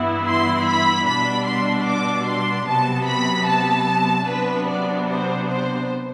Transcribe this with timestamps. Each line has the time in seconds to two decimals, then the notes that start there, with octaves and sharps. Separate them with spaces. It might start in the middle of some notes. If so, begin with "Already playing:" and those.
Already playing: G2 E3 B3 E4
0.28 C6
0.68 B5
1.07 B2 G3 D4 B5
1.47 C6
1.88 D6
2.27 C6
2.67 C3 F#3 B3 A5
3.08 B5
3.48 A5
4.28 C3 F#3 B3 D4 B4
4.68 D5
5.08 C5
5.48 C5